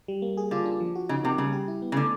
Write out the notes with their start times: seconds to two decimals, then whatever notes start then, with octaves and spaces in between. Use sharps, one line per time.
0.08 G3
0.22 A#3
0.37 G#4
0.51 D3 F4
0.65 D4
0.80 F3
0.95 F#4
1.09 C#3 D#4
1.23 C3 A#3
1.38 C#3 G3
1.53 G4
1.68 E4
1.82 B3
1.92 C#3
1.96 D3 A3